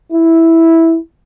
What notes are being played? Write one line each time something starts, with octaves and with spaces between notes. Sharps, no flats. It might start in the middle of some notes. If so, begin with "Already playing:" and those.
E4